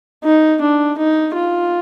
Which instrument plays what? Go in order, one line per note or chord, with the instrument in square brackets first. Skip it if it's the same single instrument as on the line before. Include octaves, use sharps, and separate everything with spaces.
[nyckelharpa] D#4
D4
D#4
F4